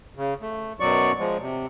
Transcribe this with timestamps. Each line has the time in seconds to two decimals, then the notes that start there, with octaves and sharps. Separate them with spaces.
0.17 C#3
0.42 A3
0.80 F#2 B2 F#3 D5 C#6
1.19 F3 G#3
1.41 C3